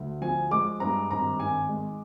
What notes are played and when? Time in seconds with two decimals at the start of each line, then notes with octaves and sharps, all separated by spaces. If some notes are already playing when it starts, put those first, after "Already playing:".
Already playing: D2
0.21 F3 G#5
0.51 G#3 D6
0.80 G2 A#5
1.11 G#1 A#5
1.40 D#3 G#5
1.69 G#3